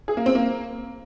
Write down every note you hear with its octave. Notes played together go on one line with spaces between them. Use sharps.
G#4
A#3
C4
A#3